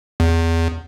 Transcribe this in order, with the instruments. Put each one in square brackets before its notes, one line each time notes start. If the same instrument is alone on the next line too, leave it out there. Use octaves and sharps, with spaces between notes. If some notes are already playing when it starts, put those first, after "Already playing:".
[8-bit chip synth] E2